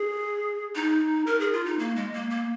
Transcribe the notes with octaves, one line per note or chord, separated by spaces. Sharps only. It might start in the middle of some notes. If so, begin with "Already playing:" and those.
Already playing: G#4
D#4
A#4
G#4
F4
D#4
A#3
G#3
A#3
A#3